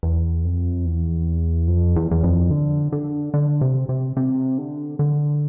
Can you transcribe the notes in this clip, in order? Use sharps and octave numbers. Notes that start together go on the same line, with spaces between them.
E2
F2
E2
F2
E2
E2
F2
D3
D3
D3
C3
C3
C3
D3
D3